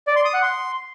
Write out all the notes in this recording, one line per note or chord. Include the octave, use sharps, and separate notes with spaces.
D5
C6
D#6
F#5
C6